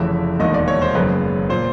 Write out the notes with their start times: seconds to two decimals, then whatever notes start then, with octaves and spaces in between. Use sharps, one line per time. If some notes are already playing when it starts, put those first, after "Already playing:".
Already playing: F1 F2 C#3 E3 E5
0.40 E1 D#2 D#3 D#5
0.54 D5
0.68 C#5
0.82 C5
0.95 F#1 F#2 C#3 B4
1.49 A#2 C5